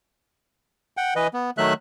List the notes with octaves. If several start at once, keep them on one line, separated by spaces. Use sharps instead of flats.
F#5 G5
E3 B4 D#5
B3
D#3 F#3 A3 E5 F#6